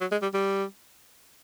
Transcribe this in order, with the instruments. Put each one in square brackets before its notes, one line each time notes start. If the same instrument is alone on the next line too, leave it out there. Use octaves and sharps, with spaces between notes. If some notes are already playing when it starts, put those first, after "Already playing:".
[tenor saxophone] F#3
G#3
G3
G3